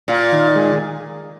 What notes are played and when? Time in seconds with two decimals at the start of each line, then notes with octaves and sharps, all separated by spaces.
0.08 A#2 F4
0.32 D#3
0.56 G#3